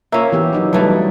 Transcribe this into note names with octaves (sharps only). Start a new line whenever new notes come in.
A#3 C#4 F4 E5
E3 B3 G4
F#3 D#4 E4
G2 E3 F#3 G3 A3 D#4